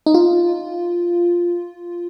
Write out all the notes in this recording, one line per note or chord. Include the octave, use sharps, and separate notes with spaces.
D#4
F4